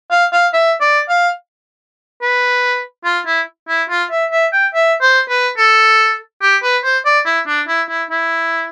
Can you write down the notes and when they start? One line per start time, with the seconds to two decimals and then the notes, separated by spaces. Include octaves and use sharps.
0.11 F5
0.33 F5
0.53 E5
0.81 D5
1.09 F5
2.22 B4
3.05 F4
3.26 E4
3.68 E4
3.89 F4
4.11 E5
4.32 E5
4.52 G5
4.74 E5
5.02 C5
5.29 B4
5.57 A4
6.42 G4
6.63 B4
6.84 C5
7.05 D5
7.25 E4
7.47 D4
7.68 E4
7.89 E4
8.10 E4